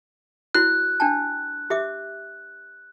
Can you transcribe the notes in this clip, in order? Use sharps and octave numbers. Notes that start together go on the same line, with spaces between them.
E4 F#4 C#5 F#6
D4 G5 A5
G4 E5 D6